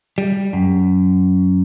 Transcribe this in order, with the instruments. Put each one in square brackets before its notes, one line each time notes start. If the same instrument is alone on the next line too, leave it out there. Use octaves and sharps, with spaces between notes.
[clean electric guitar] G3
F#2